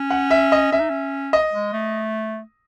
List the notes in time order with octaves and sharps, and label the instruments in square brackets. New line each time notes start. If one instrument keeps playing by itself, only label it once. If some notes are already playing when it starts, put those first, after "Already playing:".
Already playing: [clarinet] C#4
[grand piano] F#5
E5
D#5
[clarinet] C#4 [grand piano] E5
[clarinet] D#4
C#4
[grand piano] D#5
[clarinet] G#3
A3